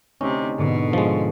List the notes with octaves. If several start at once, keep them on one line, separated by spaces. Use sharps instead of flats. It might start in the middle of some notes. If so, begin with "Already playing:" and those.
D2 C3 C#4 D#4
G#2 B2 D3
F3 G#3